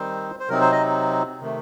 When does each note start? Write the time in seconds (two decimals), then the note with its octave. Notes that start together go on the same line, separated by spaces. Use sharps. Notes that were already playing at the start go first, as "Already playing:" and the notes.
Already playing: D#3 G3 C4 D#4 C5
0.39 C5
0.49 C3 F#3 C4 D#4 A#4
0.61 C5
0.72 D#5
1.41 C3 D#3 A3